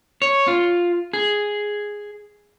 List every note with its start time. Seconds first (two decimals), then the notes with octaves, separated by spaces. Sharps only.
0.22 C#5
0.48 F4
1.13 G#4